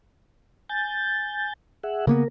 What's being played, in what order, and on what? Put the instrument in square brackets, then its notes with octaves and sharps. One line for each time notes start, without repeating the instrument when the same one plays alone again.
[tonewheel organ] G#5 G6 A6
G#4 E5 F#5
[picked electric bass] C#3 A#3 B3 [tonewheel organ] A#4